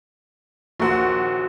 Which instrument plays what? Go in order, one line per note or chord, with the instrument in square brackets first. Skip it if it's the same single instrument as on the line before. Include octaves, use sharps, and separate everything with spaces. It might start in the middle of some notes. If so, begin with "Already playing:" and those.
[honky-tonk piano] A#1 D#2 F#5 [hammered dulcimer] F#4 A#4 C5